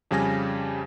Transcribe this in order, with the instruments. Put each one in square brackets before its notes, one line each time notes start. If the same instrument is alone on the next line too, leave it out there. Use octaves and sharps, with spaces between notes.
[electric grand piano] F2 C#3 G3 G#5 A#6